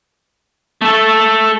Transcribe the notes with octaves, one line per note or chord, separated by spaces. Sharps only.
A3 A4